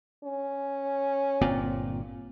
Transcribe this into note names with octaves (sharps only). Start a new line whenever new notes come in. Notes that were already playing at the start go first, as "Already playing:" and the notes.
C#4
G1 A#2 C4